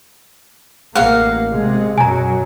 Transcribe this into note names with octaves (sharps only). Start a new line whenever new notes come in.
A1 A#3 F5 F#5
C3 G#3
F#2 B2 F#3 G#5 A#5